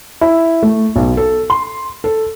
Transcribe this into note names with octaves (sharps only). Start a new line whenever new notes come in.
E4
A3
B1
A4
C6
A4